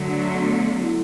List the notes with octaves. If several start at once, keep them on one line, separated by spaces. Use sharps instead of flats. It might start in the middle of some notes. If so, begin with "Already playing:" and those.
Already playing: D3 F#3 A3
B3
E4